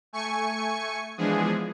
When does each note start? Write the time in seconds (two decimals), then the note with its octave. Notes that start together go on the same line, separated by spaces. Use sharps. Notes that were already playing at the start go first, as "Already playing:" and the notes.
0.13 A3 G#5 C#6 C#7
1.17 E3 F3 G#3 B3 D4 G#4